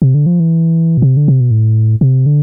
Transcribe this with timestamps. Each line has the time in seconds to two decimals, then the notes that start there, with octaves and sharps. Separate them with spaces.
0.02 C3
0.14 D3
0.26 F3
0.40 E3
0.97 B2
1.02 C3
1.17 D3
1.28 C3
1.40 B2
1.51 A2
2.01 C3
2.26 D3